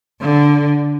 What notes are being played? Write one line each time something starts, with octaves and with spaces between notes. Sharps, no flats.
D3